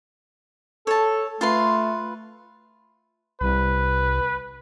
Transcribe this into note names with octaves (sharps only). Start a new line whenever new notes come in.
A4 C#5 A5
A3 F4 B4 C6
C2 B4